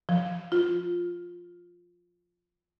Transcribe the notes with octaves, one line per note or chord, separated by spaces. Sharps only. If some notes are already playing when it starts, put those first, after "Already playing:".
F3
F4